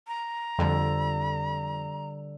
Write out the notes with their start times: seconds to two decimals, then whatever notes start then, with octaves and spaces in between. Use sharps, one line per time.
0.07 A#5
0.59 F2 D3 G3